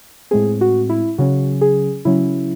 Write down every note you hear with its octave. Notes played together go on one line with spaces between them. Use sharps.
A2 G#3 C4 G#4
F#4
E4
C#3 F#3 C#4 F#4
G#4
C#3 F#3 C#4 E4